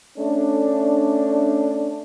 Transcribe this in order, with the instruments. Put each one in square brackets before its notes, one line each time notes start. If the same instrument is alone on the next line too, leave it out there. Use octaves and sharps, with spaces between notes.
[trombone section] A3 C#4 D4